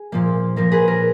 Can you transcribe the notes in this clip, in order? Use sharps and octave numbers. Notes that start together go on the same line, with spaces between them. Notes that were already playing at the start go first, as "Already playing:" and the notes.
Already playing: G#4
A#2 F3 A#3
A#2 F3 A#3 A#4
G#4 B4
A#4